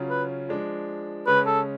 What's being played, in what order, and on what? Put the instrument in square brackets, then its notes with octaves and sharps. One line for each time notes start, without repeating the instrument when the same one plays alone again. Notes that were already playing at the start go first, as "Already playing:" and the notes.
Already playing: [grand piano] C#3 F#3 C#4 F4
[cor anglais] B4
[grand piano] F3 G#3 D4
[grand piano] C#3 G#3 C#4 [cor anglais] B4
[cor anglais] A4